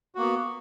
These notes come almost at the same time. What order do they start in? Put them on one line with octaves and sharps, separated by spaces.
F#4 A#3 B3